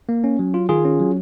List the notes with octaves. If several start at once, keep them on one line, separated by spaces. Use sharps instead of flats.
A#3
C#4
F#3
F4
D#3 F4 G#4
C#4
F#3